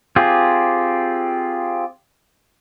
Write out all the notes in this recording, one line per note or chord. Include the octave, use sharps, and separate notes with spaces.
C4 F4 G4 G#4